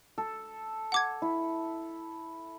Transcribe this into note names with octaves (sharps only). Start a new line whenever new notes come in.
A4
F#5 D6 G#6
E4